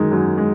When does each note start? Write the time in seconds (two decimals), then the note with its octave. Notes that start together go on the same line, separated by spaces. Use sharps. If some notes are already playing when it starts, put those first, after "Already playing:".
Already playing: F#2 D#3 G#3
0.12 F#2
0.38 G#3